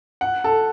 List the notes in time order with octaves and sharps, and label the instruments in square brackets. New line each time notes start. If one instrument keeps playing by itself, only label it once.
[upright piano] F#5
A4